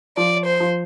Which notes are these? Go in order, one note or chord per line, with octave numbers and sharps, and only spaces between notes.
F3 D5
C5
F3